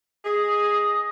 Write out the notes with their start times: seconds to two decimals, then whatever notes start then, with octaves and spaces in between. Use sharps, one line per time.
0.25 G#4 D#5